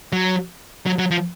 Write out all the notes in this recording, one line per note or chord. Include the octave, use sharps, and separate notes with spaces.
F#3
F#3
F#3
F3